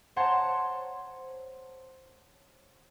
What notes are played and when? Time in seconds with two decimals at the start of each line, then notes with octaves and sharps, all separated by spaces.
0.16 C5 C#5 F#5 A5 A#5 C6